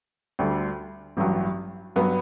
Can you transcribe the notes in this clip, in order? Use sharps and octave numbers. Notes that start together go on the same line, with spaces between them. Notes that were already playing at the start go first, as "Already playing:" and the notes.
D2 D3 G3
A1 G2 F#3
G2 F#3 B3